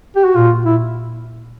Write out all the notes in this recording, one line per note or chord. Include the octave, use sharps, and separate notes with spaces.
G4
F#4
A#2 F4
E4